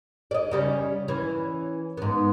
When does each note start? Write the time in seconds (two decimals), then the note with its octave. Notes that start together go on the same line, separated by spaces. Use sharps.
0.31 D5 D#5
0.51 C#3 G3 C#4
1.08 E3 C#4
1.97 G#2 B3